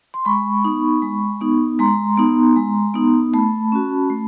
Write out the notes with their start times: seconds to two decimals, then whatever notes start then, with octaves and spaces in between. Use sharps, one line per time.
0.14 C6
0.25 G#3 B5 C#6
0.65 B3 D#4
1.02 G#3
1.41 B3 D#4
1.79 G#3 A#5 C6
2.17 B3 D#4
2.56 G#3
2.94 B3 D#4
3.33 A3 A5 B5
3.72 C#4 F#4
4.10 A3